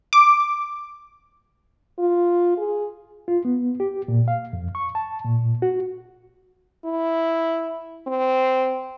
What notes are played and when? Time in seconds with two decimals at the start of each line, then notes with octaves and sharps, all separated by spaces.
0.13 D6
1.99 F4
2.58 G#4
3.28 F4
3.45 B3
3.80 G4
4.08 A#2
4.28 F5
4.53 F2
4.75 C#6
4.95 A5
5.25 A#2
5.62 F#4
6.86 E4
8.07 C4